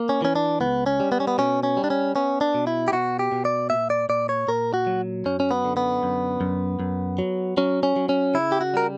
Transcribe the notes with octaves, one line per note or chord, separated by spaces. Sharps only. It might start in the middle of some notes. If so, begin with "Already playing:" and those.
Already playing: A#3
C#4
E3 C#4
D4
C#2 B3
C#4
G3
B3
C#4
B3
B2 C#4
C#4
G3
D4
C#4
B3 C#4
D4
B2
E4
G4
B2 F#4
G4
B2
D5
A#2 E5
D5
A#2 D5
C#5
A#2 A#4
F#4
F#3
F#2 C#4
C#4
B3
D3
B3
F#2
F#2
F#2
F#3
F#3 C#4
C#4
F#3
C#4
C#3 E4
G4
F#4
G3 A#4